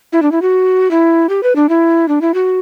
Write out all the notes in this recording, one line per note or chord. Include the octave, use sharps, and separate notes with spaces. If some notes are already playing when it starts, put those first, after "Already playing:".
E4
D4
E4
F#4
E4
G4
B4
D4
E4
D4
E4
F#4